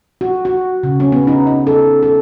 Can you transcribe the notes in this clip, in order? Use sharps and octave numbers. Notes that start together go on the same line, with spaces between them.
F#4
F#4
C#3
C#4
B3
D#4
D#4
A4
A4